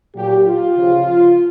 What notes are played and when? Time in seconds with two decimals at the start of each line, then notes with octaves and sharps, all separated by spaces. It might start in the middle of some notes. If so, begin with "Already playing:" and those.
0.15 A#2 F#3 G4
0.46 F4
0.76 C#3 F3